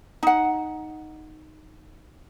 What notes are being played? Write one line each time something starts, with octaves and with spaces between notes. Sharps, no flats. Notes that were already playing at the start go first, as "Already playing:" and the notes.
D#4 F#5